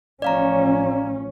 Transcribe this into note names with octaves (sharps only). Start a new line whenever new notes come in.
A1 F3 C#4 D5 F5 A#5